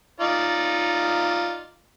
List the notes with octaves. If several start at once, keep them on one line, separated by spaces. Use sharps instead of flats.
D#4 F4 D5